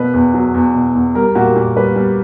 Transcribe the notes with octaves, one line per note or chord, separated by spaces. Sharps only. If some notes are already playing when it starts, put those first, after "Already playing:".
Already playing: B2 B4
E2
F#3
E2
B2
E2
G3 A#4
A#2 F#4
G4
A#2
G3 B4
G3